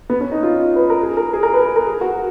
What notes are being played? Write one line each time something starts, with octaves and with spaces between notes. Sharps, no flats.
B3
C#4
D#4
F4
B4
A#4
G#4
A#4
G#4
A#4
B4
A#4
G#4
F#4